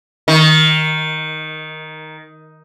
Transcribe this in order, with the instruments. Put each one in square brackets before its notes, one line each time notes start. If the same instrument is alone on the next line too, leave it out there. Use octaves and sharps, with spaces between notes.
[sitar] D#3